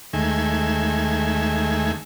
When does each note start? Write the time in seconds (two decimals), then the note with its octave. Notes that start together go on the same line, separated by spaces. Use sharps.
0.13 D#2 D#3 G#3 A3 E5 G#5